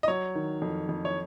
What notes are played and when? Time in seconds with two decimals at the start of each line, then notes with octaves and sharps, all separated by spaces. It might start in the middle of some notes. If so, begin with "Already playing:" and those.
0.03 D#5
0.08 F#3 C#5
0.35 D#3
0.62 F2
0.89 F2
1.05 C#5